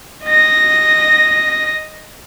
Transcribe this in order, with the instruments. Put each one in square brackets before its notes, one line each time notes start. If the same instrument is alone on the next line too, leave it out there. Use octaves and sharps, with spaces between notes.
[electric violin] D#5 A#6